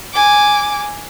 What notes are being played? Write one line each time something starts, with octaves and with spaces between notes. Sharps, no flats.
G#5 D6